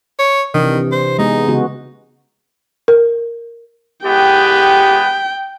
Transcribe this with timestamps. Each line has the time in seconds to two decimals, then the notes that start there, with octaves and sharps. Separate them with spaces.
0.19 C#5
0.54 C3 D#3 E3 D4
0.92 C5
1.18 G#3 B3 D#4 G#4
1.48 C#3 B3 F#4
2.88 A#4
4.05 G#3 B3 G4 G5